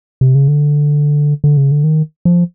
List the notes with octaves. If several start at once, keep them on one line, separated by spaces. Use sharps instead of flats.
C3
C#3
D3
D3
C#3
D3
D#3
F3